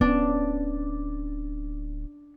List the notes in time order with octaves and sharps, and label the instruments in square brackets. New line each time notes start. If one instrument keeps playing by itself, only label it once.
[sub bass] D1 [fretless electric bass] B3 C#4 [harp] D4